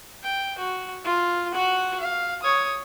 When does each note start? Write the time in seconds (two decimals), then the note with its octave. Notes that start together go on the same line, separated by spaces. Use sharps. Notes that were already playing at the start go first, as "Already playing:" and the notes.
0.23 G5
0.58 F#4
1.04 F4
1.53 F#4 F#5
2.00 F5
2.42 C#5 D#6